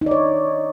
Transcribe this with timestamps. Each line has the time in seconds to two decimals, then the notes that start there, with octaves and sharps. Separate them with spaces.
0.01 D#4
0.06 D5
0.11 C#5